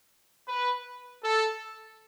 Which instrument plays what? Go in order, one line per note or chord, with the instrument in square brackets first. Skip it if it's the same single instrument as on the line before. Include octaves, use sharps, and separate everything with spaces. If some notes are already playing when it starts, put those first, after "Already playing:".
[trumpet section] B4
A4